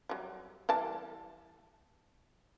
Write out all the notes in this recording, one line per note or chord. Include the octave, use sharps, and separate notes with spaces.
F#3 G3
E3 G3 A5